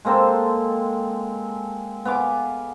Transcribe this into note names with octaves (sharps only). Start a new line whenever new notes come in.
G#3 A#3 C4 A4
B3 F5 G#5 D6